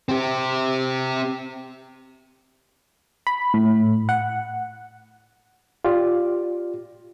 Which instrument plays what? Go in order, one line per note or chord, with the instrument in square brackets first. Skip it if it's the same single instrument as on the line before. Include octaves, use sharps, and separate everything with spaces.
[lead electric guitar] C4 G4
[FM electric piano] B5
A2
F#5
[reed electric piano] F4 G4 D5